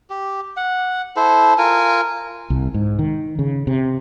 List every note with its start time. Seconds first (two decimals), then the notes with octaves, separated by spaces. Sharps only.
0.10 G4
0.57 F#5
1.16 E4 A4 C5
1.58 F4 A#4 G#5
2.50 C2
2.74 G#2
2.99 D#3
3.39 C#3
3.67 C3